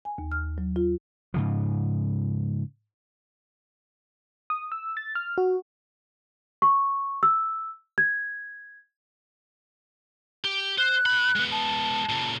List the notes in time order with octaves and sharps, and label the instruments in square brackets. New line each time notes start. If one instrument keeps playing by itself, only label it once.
[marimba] G#5
D#2
F6
F#3
F4
[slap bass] G#2 C#3 F3
[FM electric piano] D#6
E6
A6
F6
F#4
[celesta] C#6
E6
G#6
[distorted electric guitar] G4
[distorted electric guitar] C5 [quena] F#6
[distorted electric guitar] A2 B5
G#3 B3
[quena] A5
[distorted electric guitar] A#2 C#3